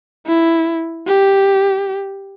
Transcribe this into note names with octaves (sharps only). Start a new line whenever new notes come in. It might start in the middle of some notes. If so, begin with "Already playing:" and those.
E4
G4